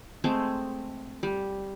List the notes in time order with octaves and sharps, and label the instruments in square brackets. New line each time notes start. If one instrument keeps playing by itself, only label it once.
[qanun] G#3 A3 C4
G3